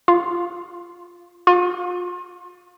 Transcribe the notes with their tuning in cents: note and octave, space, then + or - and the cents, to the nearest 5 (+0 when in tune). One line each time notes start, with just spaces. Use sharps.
F4 +0
F4 +35